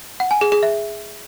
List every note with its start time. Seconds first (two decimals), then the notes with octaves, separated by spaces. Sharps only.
0.20 F#5
0.31 G#5
0.41 G#4
0.52 G#4
0.63 E5